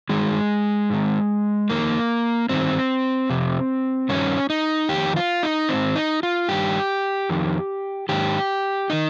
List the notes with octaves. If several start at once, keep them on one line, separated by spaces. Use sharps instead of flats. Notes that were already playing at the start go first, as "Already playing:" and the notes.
G2 D#3 G#3
G#2 D#3
F2 D#3 A#3
G2 D#3 C4
F2 C3
G2 D#3 C#4
D#4
F2 D#3 G4
F4
D#4
G#2 D#3 C4
D#4
F4
G2 D#3 G4
F2 D#3
G#2 D#3 G4
D#3 D#4